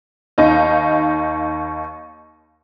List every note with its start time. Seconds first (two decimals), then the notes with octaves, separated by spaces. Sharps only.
0.38 D#2 D#4 F5